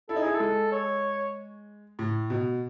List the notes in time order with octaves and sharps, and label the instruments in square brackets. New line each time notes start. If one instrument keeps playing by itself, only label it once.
[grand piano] E4 [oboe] A4
[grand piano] D#4
[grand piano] E4 [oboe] G#4
[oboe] A4
[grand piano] G#3
[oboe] C#5
[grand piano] A2
B2